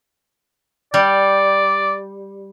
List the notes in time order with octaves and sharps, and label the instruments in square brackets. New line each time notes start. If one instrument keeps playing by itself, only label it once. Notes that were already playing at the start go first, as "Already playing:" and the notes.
[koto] G3 [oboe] D5